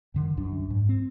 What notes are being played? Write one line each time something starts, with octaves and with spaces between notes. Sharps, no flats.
F#2 D3 D#3
C2 F#2 D4
G#2
C4